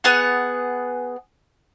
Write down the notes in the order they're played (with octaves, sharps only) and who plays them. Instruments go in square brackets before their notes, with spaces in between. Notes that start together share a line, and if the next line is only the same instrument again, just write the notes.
[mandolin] B3 G#4 F#5